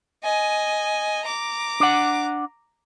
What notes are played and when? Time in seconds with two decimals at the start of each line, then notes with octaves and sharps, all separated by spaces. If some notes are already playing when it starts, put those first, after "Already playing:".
0.24 D#5 G#5
1.25 A#5 D6
1.80 D4 F#5